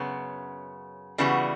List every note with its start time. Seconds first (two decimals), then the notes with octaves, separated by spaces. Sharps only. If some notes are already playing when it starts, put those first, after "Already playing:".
Already playing: F#2 C#3 B3
1.18 C#3 E3 G3 B3 F#4